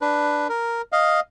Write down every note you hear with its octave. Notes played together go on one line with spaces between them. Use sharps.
D4 B4
A#4
D#5 F5